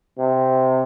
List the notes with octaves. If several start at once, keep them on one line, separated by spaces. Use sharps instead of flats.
C3